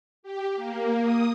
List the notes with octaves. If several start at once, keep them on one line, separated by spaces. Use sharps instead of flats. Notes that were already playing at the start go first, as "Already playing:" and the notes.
G4
A#3
D#6